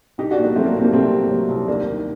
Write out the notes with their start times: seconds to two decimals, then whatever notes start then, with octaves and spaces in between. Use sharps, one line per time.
0.18 C2 D#4 G4
0.31 D4 F#4
0.38 A#2
0.43 G3 A#3
0.56 F#3 A3 C4
0.65 G3 A#3
0.74 C2
0.79 C4
0.84 G3 A#3
0.93 C2 A3 C4
1.12 A#2
1.31 F#3
1.49 C2
1.68 D#2 A#3 D4
1.87 D#3